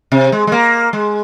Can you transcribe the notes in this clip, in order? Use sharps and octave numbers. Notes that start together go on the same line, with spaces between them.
C3
G#3
G#3
A#3
G#3